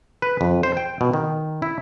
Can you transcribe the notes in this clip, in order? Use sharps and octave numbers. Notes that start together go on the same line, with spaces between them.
B4
F2
C5
G5
B2
D#3
E4